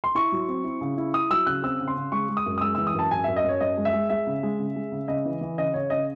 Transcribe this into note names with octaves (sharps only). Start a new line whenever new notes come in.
C6
E4 C#6
F#3
C4
E4
C#3
E4
E4 D#6
F#3 E6
C#3 F#6
C4 E6
C#3
C6
C#3
G#3 C#6
G#3
D#6
F#2
D#6
G#3 E6
E3 E6
D#6
F#2 A5
F#2 G#5
F#2 E5
D#5
F#2 C#5
F#2 D#5
G#3
E5
G#3
G#3 E5
C#3
G#3
C#3
G#3
C#3
C#3 D#5
E3
E3
C#3 D#5
C#3 C#5
C#3 D#5